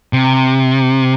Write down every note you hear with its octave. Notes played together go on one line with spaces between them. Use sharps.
C3